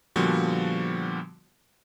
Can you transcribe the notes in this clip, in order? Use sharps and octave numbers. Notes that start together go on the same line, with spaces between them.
A#2 D3 F3 G3 B3 F#4